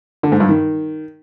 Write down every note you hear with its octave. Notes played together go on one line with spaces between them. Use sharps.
D3
G#2
G2
D#3